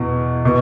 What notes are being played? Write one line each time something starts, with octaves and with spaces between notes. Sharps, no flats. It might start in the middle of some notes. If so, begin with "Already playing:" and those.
Already playing: E2 B2
B2